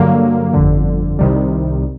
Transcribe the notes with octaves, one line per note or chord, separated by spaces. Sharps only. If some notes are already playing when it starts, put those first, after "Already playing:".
Already playing: G2 D3 F#3 A#3
G1 F2 D3
C2 C3 D#3 G3